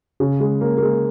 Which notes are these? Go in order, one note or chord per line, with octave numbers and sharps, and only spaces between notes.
C#3
G#3
A#3
A#3
G#3